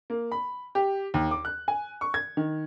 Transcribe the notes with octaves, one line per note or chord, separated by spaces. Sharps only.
A#3
B5
G4
D#2
D6
F#6
G#5
C#6
G#6
D#3